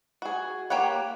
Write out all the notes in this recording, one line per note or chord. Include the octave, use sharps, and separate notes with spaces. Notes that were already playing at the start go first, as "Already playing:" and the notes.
F#4 G#4
A#3 G4 C#5 F#5